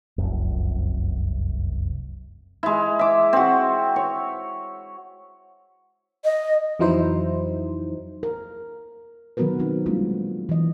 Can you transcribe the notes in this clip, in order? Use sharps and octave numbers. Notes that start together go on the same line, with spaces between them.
F1 C2 F#2
G#3 E4
E5 D6
C4 F#4
C#5
D#5
F2 E3 F#3 D#4 E4 C5
A#4
D#3 F#3 B3 F#4 A#4 B4
F#3 C4 D#4
G3 G#3 A#3 C4 D4 F4
E3 D#5